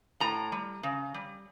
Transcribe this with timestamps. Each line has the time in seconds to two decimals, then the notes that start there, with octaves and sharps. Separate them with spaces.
0.20 A2 A#5
0.52 G3
0.83 C#3
1.14 G3